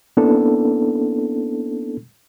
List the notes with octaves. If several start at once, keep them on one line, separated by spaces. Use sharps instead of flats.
A#3 B3 C#4 D4 E4 A4